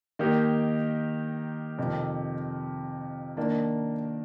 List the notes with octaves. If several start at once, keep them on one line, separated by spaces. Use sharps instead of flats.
D#3 A#3 D#4 G4
F2 C3 D#3
D#3 A#3 D4